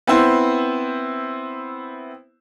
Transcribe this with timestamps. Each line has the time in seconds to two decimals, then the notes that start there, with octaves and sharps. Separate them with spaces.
0.07 B3 C4 E4 C5